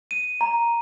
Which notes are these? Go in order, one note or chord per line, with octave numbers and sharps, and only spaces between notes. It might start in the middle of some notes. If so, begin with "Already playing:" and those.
D#7
A#5